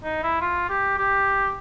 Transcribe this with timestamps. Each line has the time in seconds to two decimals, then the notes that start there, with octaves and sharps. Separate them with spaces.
0.04 D#4
0.23 E4
0.41 F4
0.70 G4
0.98 G4